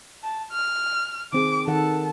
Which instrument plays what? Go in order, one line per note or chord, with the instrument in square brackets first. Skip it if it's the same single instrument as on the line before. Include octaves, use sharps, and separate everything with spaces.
[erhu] A5
F6
[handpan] D#3 C4 G#4 [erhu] D6
[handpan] D#3 A4 F#5 [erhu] A5